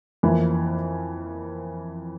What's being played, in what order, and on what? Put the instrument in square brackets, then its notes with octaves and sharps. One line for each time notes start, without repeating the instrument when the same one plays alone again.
[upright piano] F2 E3 A#3 E4